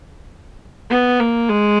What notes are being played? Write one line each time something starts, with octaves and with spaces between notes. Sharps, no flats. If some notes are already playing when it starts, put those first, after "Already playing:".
B3
A#3
G#3